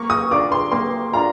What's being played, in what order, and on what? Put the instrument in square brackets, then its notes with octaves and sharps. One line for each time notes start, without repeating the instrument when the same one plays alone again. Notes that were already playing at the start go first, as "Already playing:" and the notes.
Already playing: [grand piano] A#3 [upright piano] C#6
[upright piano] D#6
[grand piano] D4 F4 A#4 D5 [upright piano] D6
[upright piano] C6
[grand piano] A#3 [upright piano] C6
[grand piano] D4 F4 A#4 D5 [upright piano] A#5